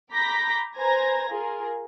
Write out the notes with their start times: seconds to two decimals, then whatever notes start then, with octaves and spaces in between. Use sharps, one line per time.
0.12 A#5 B5 D6 G6 A#6 B6
0.77 B4 C5 G#5 A#5 G#6 A#6
1.28 F4 G#4 A#4